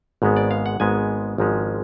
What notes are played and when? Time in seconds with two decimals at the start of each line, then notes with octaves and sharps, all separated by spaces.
0.22 G#1 G#2 G#3 B3
0.36 D5
0.51 F5
0.66 F#5
0.80 G#1 G#2 G#3 B3 G#5
1.38 G#1 G#2 F3 G#3 C#4